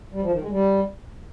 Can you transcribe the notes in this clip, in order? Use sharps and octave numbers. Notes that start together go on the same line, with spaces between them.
G3
F3
D#3
G#3
G3